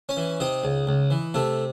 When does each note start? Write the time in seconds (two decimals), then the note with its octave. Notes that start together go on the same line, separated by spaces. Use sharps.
0.09 C#4 C#5
0.17 E3
0.40 C3 D#4 D#5
0.63 C#2
0.87 C#2
1.11 E3
1.34 C3 A3 A4